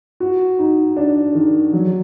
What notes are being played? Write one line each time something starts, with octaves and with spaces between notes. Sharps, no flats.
F#4
D#4
D4
D#3
F#3